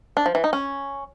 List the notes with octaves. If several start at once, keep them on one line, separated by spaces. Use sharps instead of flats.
D4
F3
E3
D#4
C#4